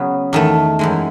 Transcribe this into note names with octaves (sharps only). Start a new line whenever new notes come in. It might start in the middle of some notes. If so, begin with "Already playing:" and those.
Already playing: C#3 F#3 B3
E2 D#3 A3
F#2 E3 G#3